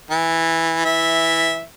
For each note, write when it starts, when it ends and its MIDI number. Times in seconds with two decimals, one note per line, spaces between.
0.11 0.82 52
0.85 1.61 52
0.85 1.61 76